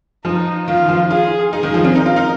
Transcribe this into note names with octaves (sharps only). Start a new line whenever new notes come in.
F3 D#4
D#3 F4
F3
F4 G#4
D#4 G#4
D#3
F3
C4
D#4 A#4
F4
D#4